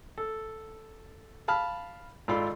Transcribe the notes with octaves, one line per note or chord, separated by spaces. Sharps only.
A4
F5 A5 B5 F6
G#1 F4 A4 D5 B5 C6